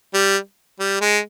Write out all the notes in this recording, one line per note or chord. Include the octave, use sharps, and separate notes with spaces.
G3
G3
G#3